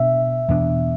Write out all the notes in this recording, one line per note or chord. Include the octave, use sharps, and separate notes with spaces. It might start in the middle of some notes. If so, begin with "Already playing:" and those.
Already playing: B2 B3 D4 E5
E2 B2 B3 D4